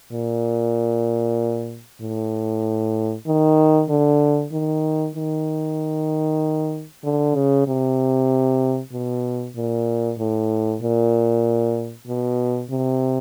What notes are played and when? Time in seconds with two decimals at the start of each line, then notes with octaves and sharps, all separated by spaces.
0.12 A#2
2.01 A2
3.26 D#3
3.90 D3
4.52 D#3
5.15 D#3
7.04 D3
7.35 C#3
7.67 C3
8.93 B2
9.56 A#2
10.19 A2
10.82 A#2
12.07 B2
12.70 C3